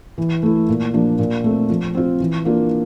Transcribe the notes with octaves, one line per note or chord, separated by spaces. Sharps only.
E3
A3 E4
A#2
F3 A#3 D4
A#2
A3 C4
F3
C4 F4
E3
A#3 D4 F4